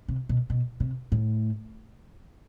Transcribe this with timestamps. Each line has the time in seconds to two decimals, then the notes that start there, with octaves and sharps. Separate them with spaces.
0.08 C3
0.29 B2
0.50 B2
0.80 C3
1.12 A2